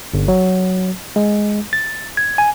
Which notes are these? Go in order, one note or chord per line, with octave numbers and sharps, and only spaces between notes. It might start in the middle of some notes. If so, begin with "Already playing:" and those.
G1
F#3
G#3
A6
G#6
G#5